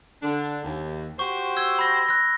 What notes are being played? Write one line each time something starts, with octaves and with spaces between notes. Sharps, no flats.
D3 D4
D#2
F#4 G4 C5 C#6
E6 G#6 G7
B5 A#6
F#6 A#6